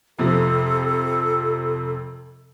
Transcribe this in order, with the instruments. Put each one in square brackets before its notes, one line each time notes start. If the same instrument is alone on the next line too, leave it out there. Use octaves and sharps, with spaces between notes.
[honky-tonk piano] F2 C3 F3 [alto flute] A4